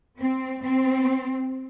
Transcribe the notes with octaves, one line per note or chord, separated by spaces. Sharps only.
C4
C4